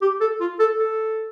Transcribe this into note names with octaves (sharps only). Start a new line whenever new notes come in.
G4
A4
F4
A4
A4